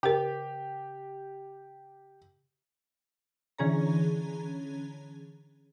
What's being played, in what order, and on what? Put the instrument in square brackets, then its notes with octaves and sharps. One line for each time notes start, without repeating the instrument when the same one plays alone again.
[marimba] C#3 A#4 [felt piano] G4
[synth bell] D3 E3 C#4 G#4 C#5 A#5